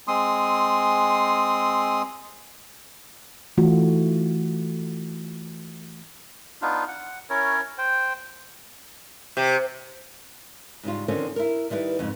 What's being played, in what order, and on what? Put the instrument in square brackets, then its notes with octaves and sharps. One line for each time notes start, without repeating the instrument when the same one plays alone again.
[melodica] G#3 C4 C6 D#6
[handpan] E3 A3 F4 F#4
[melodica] B3 D4 D#4 F4
F#5
C#4 E4 A#4 C#5
C5 G5
[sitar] C3
[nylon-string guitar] G#2 C#3 G3 F4
D3 D#3 F3 C4 C#4 F4
E4 A#4
D#3 G3 E4 B4
F2 G#2 C#3